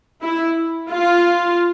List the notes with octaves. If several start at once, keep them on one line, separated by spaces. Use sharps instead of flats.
E4
F4